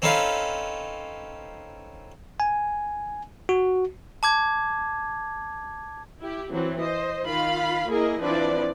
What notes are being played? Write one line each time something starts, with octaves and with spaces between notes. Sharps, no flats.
C4 C#4 D#4 A4 B4 F5
G#5
F#4
A5 D6 G#6
E4 G4
E3 F#3 C4
C5 D#5
D#3 F4 F5 B5
A#3 E4 G#4 A#4 D#5
E3 F3 C4 D4 B4 D5